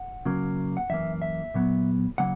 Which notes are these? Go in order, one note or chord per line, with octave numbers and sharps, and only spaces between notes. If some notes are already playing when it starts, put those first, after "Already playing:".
Already playing: F#5
C#3 F#3 A#3
F#5
F#2 E3 A#3 E5
E5
A#2 F#3 B3
C#3 F#3 A#3 F#5